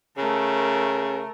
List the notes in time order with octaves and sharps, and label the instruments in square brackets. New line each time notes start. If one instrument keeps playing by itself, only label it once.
[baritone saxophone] C#3 [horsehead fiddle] A3 A#4